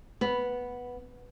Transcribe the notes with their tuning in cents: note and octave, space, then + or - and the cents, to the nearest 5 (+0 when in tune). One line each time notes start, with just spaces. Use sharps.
B3 -5